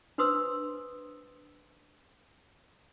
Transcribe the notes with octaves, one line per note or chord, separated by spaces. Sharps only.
D4 B4 C5 C6 D#6 E6